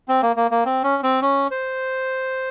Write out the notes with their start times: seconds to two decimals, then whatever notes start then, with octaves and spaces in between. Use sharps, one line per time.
0.08 C4
0.22 A#3
0.36 A#3
0.51 A#3
0.65 C4
0.83 C#4
1.03 C4
1.22 C#4
1.51 C5